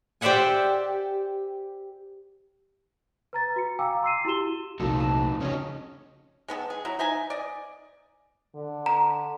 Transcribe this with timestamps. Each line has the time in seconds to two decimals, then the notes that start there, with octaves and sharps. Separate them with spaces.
0.21 G4 C5 D5 E5 F#5 G#5
3.33 B4 A#5 A6
3.56 F#4 C#7
3.79 F5 G5 G#5 A#5 D6 E6
4.03 C6 E6 C7 D#7
4.25 E4 F#4 G4 C6 E7 G7
4.80 C2 A#2 F3 A3 D#4 F#4 A4
5.00 B4 A5
5.41 C#3 C4 C#4 D#4 C#5 D#5
6.48 G#3 B3 G#4 A4
6.70 G#4
6.85 F#3 E4
6.99 D#4 D#5 E5 G#5
7.30 D5 D#5
8.55 D3
8.86 A#5